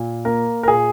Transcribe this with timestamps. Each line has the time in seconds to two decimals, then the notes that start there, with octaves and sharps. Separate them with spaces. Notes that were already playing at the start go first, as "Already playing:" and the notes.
Already playing: A#2
0.25 A#3 A#4
0.63 A#4
0.68 A#2 G#4